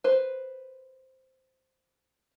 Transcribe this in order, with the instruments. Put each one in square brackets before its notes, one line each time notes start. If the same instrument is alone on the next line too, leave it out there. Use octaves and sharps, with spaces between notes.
[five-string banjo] B4 C5